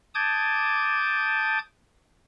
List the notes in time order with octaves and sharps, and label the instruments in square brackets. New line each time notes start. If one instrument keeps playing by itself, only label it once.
[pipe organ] A5 D6 D#6 G6 G#6